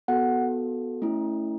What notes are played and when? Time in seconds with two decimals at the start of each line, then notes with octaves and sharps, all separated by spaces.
0.08 B3 F#4 A4 F#5
1.02 A3 C#4 E4